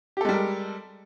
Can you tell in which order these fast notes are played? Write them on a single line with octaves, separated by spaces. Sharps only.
G4 A4 G#3 G3 A#4